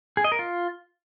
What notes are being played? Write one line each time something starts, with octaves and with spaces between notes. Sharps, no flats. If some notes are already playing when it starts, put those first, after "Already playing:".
G#4
D#5
A#4
F4